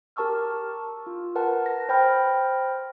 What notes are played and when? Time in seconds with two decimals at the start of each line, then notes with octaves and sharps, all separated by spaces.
0.16 G4 A#4 A5 C#6 E6 F6
1.06 F4
1.35 A#4 B4 F#5 A5
1.66 A#6
1.89 C5 G5 B5 F6